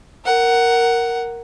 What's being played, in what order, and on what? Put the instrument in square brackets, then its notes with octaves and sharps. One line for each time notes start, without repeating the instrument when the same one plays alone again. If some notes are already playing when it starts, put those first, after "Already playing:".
[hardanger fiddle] A#4 F#5